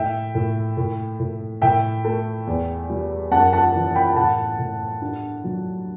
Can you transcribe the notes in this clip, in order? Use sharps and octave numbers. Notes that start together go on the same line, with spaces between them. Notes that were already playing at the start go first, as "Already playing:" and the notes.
Already playing: A2 E5 G5
A2
A2
A2
A2 E5 G5
A3
E2
G3
F#2 F#5 A5
F#5 A5
E3
G5 B5
A2 F#5 A5
A2
G2
F#3